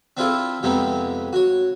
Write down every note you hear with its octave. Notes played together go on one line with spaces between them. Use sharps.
C4 D4 E4 F4 G#4 A4
F2 C3 G#3 B3 C4 D#4
F#4 C#5